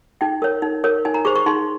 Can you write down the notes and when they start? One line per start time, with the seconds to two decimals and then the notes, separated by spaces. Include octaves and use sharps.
0.21 D#4 G5
0.42 A#4 C#5
0.62 D#4
0.84 A#4 C#5
1.05 D#4 G#5
1.14 A#5
1.25 G#4 C5 C#6
1.35 C#6
1.46 D#4 C6